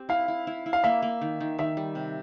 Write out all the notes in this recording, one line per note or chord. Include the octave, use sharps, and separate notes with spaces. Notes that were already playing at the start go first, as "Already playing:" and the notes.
Already playing: C4 G4
E4 F5
E4
E4
E4
F5
A#3 E5
A#3
D#3
D#3
D#3 E5
G3
C3